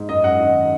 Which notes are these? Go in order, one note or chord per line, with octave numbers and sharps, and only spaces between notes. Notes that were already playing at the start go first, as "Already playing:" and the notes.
Already playing: G#2
F#2 D#5
F#2 F#5
D#3 D#5